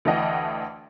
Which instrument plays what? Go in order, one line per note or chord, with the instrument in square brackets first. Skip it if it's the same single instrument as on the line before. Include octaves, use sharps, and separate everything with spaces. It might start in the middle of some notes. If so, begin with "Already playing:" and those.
[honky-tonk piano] D2 E3 D4 D#5 F#5 G5